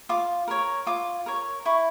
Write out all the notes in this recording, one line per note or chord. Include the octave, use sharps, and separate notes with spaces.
F4 D6
A#4 C#5
F4 D6
A#4 C#5
E4 C#6